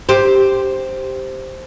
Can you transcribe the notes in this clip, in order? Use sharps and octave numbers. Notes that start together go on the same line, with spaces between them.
G4 C5